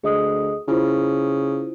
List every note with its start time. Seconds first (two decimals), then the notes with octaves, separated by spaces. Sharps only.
0.04 D2 G#4 D#5 D#6
0.68 C#3 E4 F4 C5